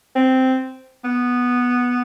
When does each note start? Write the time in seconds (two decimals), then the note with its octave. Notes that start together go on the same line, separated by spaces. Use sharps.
0.15 C4
1.04 B3